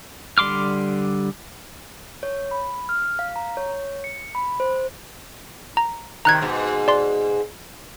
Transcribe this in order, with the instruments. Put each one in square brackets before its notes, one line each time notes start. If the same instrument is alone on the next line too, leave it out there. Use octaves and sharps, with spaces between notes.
[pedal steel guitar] D3 G3 C6 D6 F6
[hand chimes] C#5
B5
F6
F5
A#5
C#5
C#7
B5
C5
[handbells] A#5
[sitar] C3 D#3 [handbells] A#5 F#6 G#6
[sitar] G#2 B2
[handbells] D5 C6